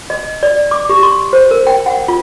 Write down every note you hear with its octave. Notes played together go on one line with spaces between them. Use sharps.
D#5
D5
D6
G4
C6
C5
A#4
G5
F#5
F4